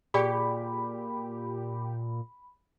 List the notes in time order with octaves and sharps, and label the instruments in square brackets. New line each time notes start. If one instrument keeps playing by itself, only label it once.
[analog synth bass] A#2 [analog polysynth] G4 [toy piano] G#4 D5 G5 [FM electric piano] B5